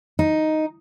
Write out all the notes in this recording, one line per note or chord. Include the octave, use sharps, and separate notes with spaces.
D#4